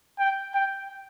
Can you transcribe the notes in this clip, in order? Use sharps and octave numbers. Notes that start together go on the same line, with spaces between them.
G5
G5